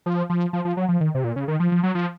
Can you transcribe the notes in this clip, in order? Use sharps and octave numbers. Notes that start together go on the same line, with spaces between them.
F3
F3
F3
F3
F#3
F3
D#3
C3
A#2
C#3
D#3
F3
F3
F#3
F3